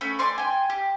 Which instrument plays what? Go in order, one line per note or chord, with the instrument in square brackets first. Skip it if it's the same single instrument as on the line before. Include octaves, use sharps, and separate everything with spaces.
[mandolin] A3 C#4 B5
D5 G#5 C6 C#6
G5 G#5
G4